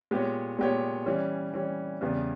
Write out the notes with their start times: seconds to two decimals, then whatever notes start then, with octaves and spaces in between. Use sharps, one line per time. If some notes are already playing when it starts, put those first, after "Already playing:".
0.11 A#2 G#3 B3 G4 C#5
0.59 A#2 G#3 B3 G4 C#5
1.06 E3 G3 C#4
1.54 E3 G3 C#4
2.01 E2 C#3 G3 B3